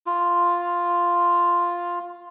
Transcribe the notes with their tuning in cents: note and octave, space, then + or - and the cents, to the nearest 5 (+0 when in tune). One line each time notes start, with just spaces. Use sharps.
F4 +0